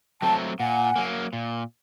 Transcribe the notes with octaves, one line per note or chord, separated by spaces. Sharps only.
F#3 A3 C4 G5 A5
A#2 F#5 G#5
F#3 A#3
A#2